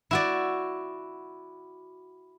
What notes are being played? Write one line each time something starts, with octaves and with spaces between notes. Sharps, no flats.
E4 F#4 D5